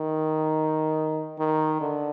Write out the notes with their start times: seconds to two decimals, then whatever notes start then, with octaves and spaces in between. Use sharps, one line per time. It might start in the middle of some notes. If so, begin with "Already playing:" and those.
Already playing: D#3
1.39 D#3
1.81 D3